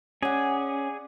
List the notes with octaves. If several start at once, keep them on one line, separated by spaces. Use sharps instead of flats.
C#4 G#4 D5 F#5